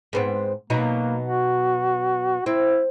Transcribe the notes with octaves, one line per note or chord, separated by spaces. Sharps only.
G#2 B3 C4
B2 F#3 A#3 D#4
F#4
C4 E4